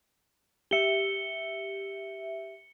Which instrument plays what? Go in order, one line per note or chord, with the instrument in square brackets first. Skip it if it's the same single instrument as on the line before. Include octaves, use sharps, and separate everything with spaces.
[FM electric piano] G4 E5 [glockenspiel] C#7 G7